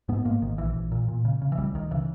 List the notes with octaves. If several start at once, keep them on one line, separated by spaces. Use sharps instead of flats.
G#2 B3
G#2 A#3
G#1 D#3
A#1 E3
A#1
A#2
A#2
C#3
C#3
E3
C#2 G3
C#2 D#3
C#3 E3